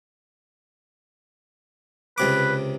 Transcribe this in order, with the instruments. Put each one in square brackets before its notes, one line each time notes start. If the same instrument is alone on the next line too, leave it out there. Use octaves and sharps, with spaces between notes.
[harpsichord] C#2 C3 D6 [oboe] B4